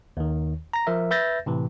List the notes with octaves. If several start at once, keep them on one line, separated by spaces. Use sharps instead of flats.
D#2 D#3
A#5 A#6
F3 A#4 E5
B4 E5 G6 A6 A#6
A2 C3 E3